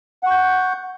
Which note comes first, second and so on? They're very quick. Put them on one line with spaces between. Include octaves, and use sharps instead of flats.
F#5 C#6 G6